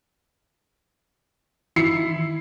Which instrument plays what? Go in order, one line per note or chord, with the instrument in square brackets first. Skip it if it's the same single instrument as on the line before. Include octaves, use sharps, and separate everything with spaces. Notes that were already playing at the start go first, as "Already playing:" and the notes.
[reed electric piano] D#3 E3 [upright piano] E4 C7 C#7